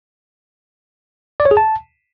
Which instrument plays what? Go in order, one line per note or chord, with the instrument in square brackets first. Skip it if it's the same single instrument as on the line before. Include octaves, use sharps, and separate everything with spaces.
[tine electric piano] D5
C#5
G#4
A5